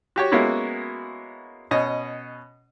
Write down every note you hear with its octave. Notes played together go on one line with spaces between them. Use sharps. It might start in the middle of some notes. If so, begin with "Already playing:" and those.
F#4 G4 C#5
G#3 A#3 B3 C#4 E4 F#4
B2 C#4 D#5